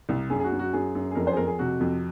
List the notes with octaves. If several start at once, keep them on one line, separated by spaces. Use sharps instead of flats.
C2
F#2 G#4
G#4
F#4
F#2
F#4
F#2 G#4
F#2
G#4
F2 A#4
C5
G#4
F2 A#4
G#4
C3 F#4
F2